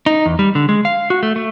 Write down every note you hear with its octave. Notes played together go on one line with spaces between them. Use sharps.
D#4
E2
G3
D3
G#3
F5
F#4
A3
A3